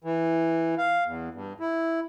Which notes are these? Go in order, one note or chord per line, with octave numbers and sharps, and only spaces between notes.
E3
F5
E2
G2
E4